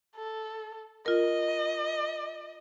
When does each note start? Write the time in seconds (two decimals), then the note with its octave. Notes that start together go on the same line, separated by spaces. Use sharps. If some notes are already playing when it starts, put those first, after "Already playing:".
0.16 A4
1.06 F4 A#4 D#5